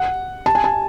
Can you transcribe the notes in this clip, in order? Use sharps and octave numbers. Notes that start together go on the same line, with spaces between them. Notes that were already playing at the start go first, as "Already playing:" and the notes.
Already playing: F#5
A5
G#5
A5